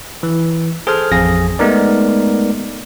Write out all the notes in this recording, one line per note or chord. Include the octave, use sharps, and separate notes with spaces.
E3
G#4 A4 C5 G#5 F6
A1 F2 G#4 A#6
G#3 A3 B3 D#4 A#4 D5